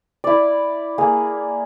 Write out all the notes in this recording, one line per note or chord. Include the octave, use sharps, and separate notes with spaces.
E4 D5
A#3 G#4